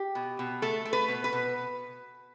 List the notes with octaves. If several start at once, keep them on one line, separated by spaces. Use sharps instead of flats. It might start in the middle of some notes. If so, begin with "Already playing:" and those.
Already playing: G4
B2
B2
A3 A4
A3
B4
B2
B4
B2